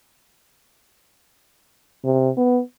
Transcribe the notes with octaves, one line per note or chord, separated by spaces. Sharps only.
C3
B3